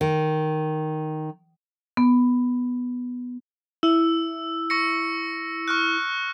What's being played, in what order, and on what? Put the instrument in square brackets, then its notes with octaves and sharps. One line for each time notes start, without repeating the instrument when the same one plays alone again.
[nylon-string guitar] D#3
[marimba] B3
[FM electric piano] E4 [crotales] E6
[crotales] C#6 A#6 C#7
C#6 F6 F#6